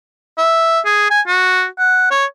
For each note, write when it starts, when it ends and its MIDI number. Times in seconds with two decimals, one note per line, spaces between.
0.38 0.80 76
0.85 1.10 68
1.10 1.21 80
1.27 1.66 66
1.78 2.09 78
2.11 2.25 73